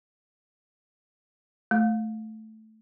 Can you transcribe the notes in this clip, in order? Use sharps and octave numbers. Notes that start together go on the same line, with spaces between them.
A3